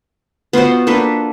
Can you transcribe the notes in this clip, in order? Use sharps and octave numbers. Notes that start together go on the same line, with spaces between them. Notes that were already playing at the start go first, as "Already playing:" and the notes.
B3 F4 F#4 C5
A#3 D4 A4 B4